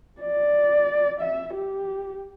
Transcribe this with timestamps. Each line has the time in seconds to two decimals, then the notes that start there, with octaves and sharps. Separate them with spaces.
0.22 D5
1.21 E5
1.54 G4